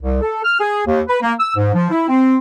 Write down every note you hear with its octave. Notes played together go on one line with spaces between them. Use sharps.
C2
A4
F6
G#4
D#2
B4
A#3
E6
G#2
F3
E4
C4